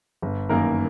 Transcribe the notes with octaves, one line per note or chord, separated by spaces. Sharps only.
G1
F#2 D#3 A#3 A#4